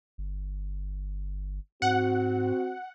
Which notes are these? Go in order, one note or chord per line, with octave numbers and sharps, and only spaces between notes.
G1
G#2 C4 F#4 F#5